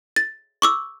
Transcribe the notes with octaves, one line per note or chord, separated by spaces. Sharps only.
A6
C#6 D6 E6